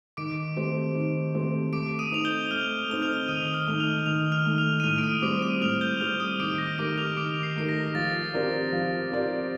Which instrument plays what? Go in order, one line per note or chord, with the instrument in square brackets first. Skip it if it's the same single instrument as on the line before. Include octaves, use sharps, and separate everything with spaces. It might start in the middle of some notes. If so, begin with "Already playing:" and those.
[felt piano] D#3 [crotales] D6 D7
[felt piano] A3 C4 G4 C5
D#3
A3 C4 G4 C5
[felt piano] A3 [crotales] D6 D7
[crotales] D#6 D#7
[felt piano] C4 D#4 A4 [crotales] F7
[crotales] G6 G7
[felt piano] A3 [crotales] F6 F7
[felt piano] C4 D#4 A4 [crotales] G7
[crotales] F6 F7
[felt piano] D#3 [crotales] D#6 D#7
[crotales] G7
F6 F7
[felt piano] A3 D#4
[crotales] F6 F7
G7
[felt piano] D#3 [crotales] F6 F7
[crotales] F6 F7
[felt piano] A3 D#4
[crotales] F6 F7
D#7
[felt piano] A2 [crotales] F6 F7
[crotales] D7
D#6 D#7
[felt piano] G3 C4 [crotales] D6 D7
[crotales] D#6 D#7
[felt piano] A2 [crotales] F6 F7
[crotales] G6 G7
[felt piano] G3 C4 [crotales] F6 F7
[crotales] D#6 D#7
[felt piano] D#3 [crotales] D6 D7
[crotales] A#6
[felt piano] A3 D#4 G4 A#4 [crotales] D6 D7
[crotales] F6 F7
[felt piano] D#3 [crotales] D6 D7
[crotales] C7
[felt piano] A3 D#4 G4 A#4 [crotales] C7
[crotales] A#6
[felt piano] F3 [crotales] A6
[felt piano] C4 G4 A#4 D5
F3
C4 G4 A#4 D5